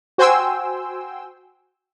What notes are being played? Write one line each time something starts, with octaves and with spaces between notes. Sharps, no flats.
F#4 C5 G5 G#5 C6 E6